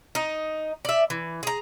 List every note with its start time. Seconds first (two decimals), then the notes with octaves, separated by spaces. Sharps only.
0.15 D#4
0.85 D5 E5
1.10 E3
1.43 G#4 A#5